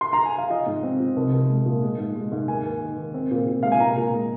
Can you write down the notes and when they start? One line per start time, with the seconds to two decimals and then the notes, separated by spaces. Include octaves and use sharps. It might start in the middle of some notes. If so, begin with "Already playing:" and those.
0.01 C6
0.13 A#5
0.26 G#5
0.38 F5
0.50 F3 D#5
0.66 G#2
0.83 C4
1.00 F3
1.16 C2
1.33 C2
1.50 G#3
1.65 A#2
1.82 G#3
1.99 G#2
2.15 G#3
2.32 G#2
2.48 D#2 G#5
2.65 D#2
2.81 D#3
2.98 D#2
3.14 C4
3.31 A#2
3.47 A#2
3.63 G#3 F5
3.72 G#5
3.80 A#2 A#5
3.97 A#2
4.13 G#3